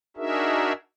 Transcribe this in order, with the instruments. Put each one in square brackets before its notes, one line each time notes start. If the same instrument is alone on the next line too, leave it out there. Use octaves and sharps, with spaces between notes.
[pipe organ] D4 D#4 F#4 G#4 A#4 E5